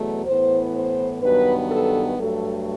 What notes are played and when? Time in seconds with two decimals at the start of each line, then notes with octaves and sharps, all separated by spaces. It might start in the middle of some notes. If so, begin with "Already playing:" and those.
Already playing: E2 B2 F#3 A3
0.26 A2 E3 B3 C5
0.74 C5
1.22 G2 D#3 F#3 B3 B4
1.70 A4
2.17 G2 F#3 A3 A4